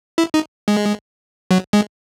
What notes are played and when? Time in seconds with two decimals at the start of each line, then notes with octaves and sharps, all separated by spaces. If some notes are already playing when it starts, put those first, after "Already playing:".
0.18 E4
0.34 D#4
0.68 G#3
1.51 F#3
1.73 G#3